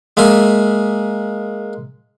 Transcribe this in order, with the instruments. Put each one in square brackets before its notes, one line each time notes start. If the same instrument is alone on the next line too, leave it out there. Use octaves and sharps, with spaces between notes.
[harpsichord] G#3 A#3 E5 G#5